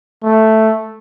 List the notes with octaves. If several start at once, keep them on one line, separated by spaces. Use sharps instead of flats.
A3